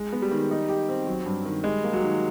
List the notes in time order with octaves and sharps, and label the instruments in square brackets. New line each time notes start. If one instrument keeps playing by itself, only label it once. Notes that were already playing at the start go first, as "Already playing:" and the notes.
Already playing: [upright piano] G#3
B3
[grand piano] G3
[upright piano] D#3
D#4
G4
C4
F#3
G2
D#3
[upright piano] G3 [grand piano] G#3
[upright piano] A#3
[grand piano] F#3
[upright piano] D#3